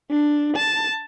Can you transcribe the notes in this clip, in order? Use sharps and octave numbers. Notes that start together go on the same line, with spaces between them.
D4
A5